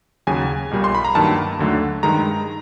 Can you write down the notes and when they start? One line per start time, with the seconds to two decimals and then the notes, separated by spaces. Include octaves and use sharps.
0.27 D#2 C#3 F#3 G#5
0.71 B1 A#2 G3 A#3
0.84 C6
0.95 B5
1.04 A#5
1.15 G2 D#3 F#3 A#3 A5
1.59 D#2 D3 F#3 A3
2.03 G2 D#3 G#3 A#5